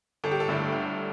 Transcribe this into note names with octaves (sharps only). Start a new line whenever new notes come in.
G1 A4
G4
A4
G2 D3 A3 E4
G1